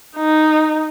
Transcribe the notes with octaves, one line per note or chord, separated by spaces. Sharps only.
D#4